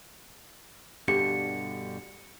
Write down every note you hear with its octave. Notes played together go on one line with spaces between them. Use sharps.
G2 B2 D3 G4 C#7